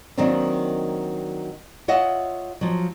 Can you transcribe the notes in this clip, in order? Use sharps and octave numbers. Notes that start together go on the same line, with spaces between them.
D#3 F#3 A#3 C4 D4 D#4
F4 C#5 D#5 E5 F#5
F3 F#3